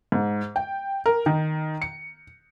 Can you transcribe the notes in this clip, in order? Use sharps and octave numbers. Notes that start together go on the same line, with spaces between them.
G#2
G5
A#4
D#3
C#7